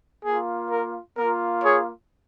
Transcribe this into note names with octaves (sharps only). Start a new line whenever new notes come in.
A#3 F4 G#4
A#4
A#3 F4 A#4
G#4 C#5